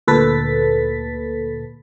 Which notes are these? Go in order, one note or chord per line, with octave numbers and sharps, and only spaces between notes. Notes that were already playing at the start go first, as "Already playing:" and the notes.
D2 A#2 A4 B4 A6 B6